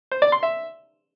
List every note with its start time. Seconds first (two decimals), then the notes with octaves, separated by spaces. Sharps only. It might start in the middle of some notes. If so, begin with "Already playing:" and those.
0.11 C5
0.22 D5
0.32 C6
0.43 E5